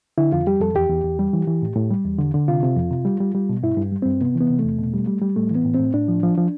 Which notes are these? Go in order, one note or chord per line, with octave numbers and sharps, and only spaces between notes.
D3 E4
F2 F4
G3 G4
F2 A4
E2 G4
E2
E2
G3
E3
E3
A2
A2
G3
E2
D3
D3
C3 F4
C3
F2
C3
G3
G3
G3
B2
G2 E4
G2
G3
G2 C4
C3 B3
E3
B3
C3
A3
E2
B2
G3
G3
G3
A2 A3
E3
B3
A2
C4
A2
A2 D4
F3
F3
F3